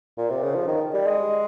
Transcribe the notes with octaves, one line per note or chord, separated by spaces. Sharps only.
A#2
C3
C#3
F3
D#3
G3
G#3